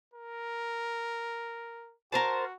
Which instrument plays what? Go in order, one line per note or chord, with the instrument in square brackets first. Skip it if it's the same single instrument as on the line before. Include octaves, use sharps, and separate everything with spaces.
[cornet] A#4
[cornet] F#4 [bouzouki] A#4 C5 A5